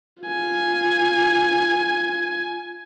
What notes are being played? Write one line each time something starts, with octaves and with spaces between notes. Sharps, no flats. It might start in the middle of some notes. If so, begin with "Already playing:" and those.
F4 G#5